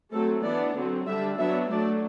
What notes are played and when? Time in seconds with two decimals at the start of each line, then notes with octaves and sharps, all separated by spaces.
0.12 F#3 A3 C4 A4
0.44 E3 B3 D4 D5
0.76 D3 F#3 C4
1.07 D3 G3 D4 E5
1.39 F#3 B3 D4 E5
1.70 F#3 A3 D4 D5